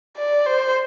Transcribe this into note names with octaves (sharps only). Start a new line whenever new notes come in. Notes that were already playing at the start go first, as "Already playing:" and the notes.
D5
C5